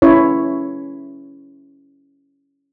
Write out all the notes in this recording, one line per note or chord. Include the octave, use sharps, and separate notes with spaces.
C#4 E4 C#5